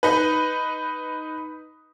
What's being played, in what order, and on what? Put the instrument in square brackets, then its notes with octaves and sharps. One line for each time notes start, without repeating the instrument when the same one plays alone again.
[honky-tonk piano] D#4 B4